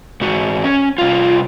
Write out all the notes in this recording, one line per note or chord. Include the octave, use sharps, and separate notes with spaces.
G#2 F#4
C#4
C2 F4